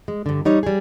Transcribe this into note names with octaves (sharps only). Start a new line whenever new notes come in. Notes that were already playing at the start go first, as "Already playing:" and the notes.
G#3
G2 D3
G3 D#4 C#5
G3 G#4